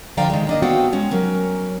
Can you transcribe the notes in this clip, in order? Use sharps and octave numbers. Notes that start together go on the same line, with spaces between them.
D3 F3 D5 F5 G5 A#5
D#3 G#3
A#3 D4 D#5
B3 C4 F#4 A4 F5 G5
G#3 C#4
F#3 C#4 A#4